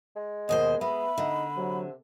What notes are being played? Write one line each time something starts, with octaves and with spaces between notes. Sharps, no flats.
G#3
D#2 B2 C5 D#5
G#3 B3 E5 B5
D3 D#4
C3 F#3